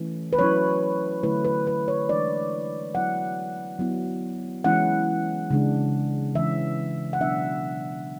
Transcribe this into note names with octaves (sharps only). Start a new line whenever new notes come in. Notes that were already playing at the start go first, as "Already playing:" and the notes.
Already playing: E3 A3 C#4
B4
F#3 C#4 E4 C#5
D3 F#3 A3 E4 B4
B4
B4
C#5
E3 G#3 D4 D5
F#3 B3 E4 F#5
F#3 B3 E4
E3 G#3 C#4 E4 F#5
C#3 G#3 D4
E3 G#3 C#4 E5
F#5
B2 F#3 B3 D4 E5